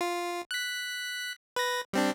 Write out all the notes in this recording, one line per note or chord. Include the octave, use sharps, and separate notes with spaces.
F4
F#6 B6
B4 A#6
G3 C4 D4